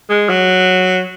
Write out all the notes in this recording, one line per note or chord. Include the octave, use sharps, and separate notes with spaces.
G#3
F#3